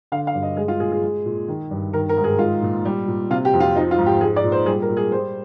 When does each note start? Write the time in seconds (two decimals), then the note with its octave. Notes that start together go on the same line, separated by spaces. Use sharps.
0.12 D3 F5
0.27 F5
0.34 G2
0.43 D#5
0.57 G#3 G#4
0.68 F4
0.80 A#2 G#4
0.92 G#4
1.03 G#3
1.25 A#2
1.48 D#3
1.71 G2
1.93 D#3 A#4
2.09 A#4
2.17 G#2
2.24 G#4
2.39 G#3 F4
2.62 A#2
2.85 G3
3.08 A#2
3.30 C3 F4
3.45 G4
3.53 F2
3.60 F4
3.76 F3 D#4
3.91 F4
3.98 G#2
4.06 G4
4.21 G#3 G#4
4.36 D5
4.44 A#2
4.52 C5
4.66 G3 G#4
4.82 A#4
4.89 A#2
4.97 G#4
5.12 G3 C5